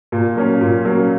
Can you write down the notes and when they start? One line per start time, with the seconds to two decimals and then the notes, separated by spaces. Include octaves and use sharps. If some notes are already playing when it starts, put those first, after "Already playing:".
0.12 A#2
0.36 F#3 A#3 C#4
0.61 A#2
0.85 F#3 A#3 C#4